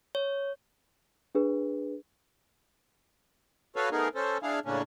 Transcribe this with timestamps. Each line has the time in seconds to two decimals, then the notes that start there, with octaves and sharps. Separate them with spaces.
0.15 C#5
1.35 D4 G#4 B4
3.76 F#4 A4 B4 C#5 F5
3.92 A3 B3 D#4 G#4 A#4
4.15 C#4 A4 C5
4.42 D4 E4 G#4 F5
4.65 A2 C#3 A#3 C#4 D4